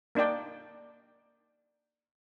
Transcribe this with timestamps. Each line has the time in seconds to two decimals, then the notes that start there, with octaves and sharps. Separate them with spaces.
0.15 A#3 D4 D#4 D5 G5